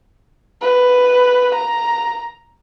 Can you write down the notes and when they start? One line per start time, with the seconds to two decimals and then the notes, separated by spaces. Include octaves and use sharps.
0.62 B4
1.55 A#5